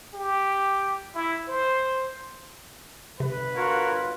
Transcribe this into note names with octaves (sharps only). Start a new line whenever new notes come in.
G4
E4
C5
G1 C3 B4
F4 F#4 A#4 C#5